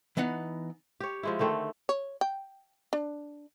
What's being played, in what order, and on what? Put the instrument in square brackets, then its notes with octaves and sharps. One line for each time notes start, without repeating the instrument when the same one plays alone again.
[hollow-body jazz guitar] E3 B3 D#4 F#5
[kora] G4 C#5
F3 G#3 E4
D3 D#3 A3 C4
[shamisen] C#5
G5
D4